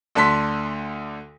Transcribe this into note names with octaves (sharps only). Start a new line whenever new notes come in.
D2 D3 A5 C6 B6